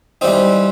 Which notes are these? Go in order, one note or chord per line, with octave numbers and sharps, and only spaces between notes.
E3 G3 C4 D#4